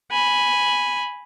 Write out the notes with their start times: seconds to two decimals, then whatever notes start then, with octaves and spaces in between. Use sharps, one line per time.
0.11 G#5 B5